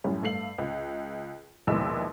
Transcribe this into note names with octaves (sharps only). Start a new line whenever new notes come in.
F#2 A2 G3 C#4
G2 A3 F5 C7 F#7
C#2
A#1 D#2 B2 G#3 E4 E6